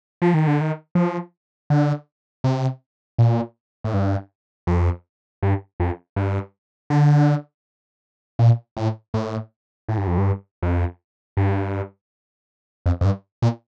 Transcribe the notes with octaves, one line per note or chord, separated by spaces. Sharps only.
F3
D#3
D3
D#3
F3
D3
C3
A#2
A2
G2
F2
G2
F2
G2
D3
A#2
A2
A2
A2
G2
F2
G2
F2
G2
F2
F2
G2
A#2